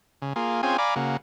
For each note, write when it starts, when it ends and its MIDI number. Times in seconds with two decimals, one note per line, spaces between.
0.22 0.33 49
0.36 0.61 58
0.36 0.61 65
0.36 0.61 68
0.63 0.77 60
0.63 0.77 61
0.63 0.77 65
0.63 0.77 68
0.63 0.77 79
0.63 0.77 80
0.78 0.94 74
0.78 0.94 77
0.78 0.94 80
0.78 0.94 82
0.78 0.94 83
0.78 0.94 86
0.96 1.17 49
0.96 1.17 58
0.96 1.17 66